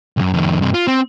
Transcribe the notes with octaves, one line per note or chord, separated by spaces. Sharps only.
B1 F#2
F2 D#3
G2 C3
F4
C4